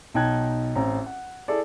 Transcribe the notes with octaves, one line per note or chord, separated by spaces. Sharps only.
B1 D#4 G5 A5 F#6 G#6
A1 C4 A#5
F#5
E4 G#4 A4 D5